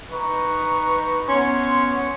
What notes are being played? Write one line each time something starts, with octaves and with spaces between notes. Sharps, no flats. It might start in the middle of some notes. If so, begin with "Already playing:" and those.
D#4 B4 A#5 C#6
B3 C#4 C6